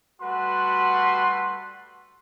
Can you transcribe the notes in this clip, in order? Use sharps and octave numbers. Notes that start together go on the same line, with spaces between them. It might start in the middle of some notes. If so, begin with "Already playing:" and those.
G3 A3 F#4 B4 F#5 C6